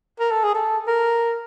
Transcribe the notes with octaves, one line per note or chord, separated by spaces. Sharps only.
A#4
A4
G#4
A4
A#4